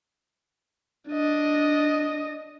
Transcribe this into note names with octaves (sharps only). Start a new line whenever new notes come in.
D4 D#5